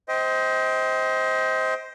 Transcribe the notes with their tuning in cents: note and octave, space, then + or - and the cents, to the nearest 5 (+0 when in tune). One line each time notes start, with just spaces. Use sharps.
C5 +0 D#5 +30 G5 +0